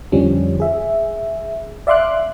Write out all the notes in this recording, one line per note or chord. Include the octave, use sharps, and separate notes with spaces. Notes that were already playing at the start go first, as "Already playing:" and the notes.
F2 D3 F3 G3 C#4
G#4 E5
D5 E5 F5 C6 D6 F#6